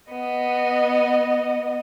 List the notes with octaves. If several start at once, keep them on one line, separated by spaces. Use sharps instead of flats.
B3 D#5